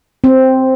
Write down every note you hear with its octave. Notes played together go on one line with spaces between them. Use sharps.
C4